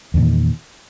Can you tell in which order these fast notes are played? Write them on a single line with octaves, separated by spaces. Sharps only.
E2 D3 A#2 D#3